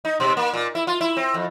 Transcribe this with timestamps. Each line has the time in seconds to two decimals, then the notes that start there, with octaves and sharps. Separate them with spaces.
0.05 D#4
0.20 B2
0.37 A#3
0.54 A#2
0.75 E4
0.87 F4
1.01 E4
1.17 C4
1.34 F2